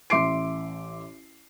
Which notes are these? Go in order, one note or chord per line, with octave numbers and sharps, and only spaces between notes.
A1 E5 C6 D6 C7 D7